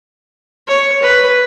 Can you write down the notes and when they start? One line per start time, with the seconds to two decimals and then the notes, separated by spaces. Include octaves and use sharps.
0.67 C#5
1.02 B4